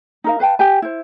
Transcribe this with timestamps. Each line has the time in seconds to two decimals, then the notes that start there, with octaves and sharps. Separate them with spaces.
0.24 D#4 A#4 F5
0.40 B4 F5 G5 A5
0.59 G4 G#5
0.82 E4 C5